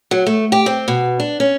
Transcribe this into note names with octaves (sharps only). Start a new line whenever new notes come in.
F#3
A3
G4
C4
B2
D4
C#4